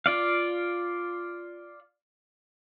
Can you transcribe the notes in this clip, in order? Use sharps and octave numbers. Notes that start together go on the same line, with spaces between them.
F4 D5 F5